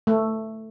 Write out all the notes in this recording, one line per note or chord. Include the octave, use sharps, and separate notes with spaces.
A3